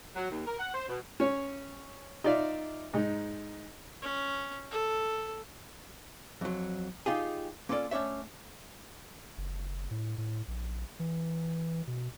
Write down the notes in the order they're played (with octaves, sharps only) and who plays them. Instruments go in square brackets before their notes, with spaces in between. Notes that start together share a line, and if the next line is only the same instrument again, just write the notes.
[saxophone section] F#3
D#2
A#4
F#5
C5
B2
[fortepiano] C#4 C#5
D#4 F4 D5 E5
G#2 D#4
[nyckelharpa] C#4
A4
[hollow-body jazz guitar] F2 F#3
D#4 F4 G4 G#4
A#3 C#4 F4 A4 D5
A3 C#4 D4 C#5 E5
[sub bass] F#1
A2
A2
A#1
E3
B2